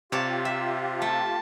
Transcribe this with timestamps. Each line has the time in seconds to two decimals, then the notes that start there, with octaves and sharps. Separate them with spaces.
0.12 C3 F4 G4 C#5 D5 A5
0.45 E5
1.02 A3 A5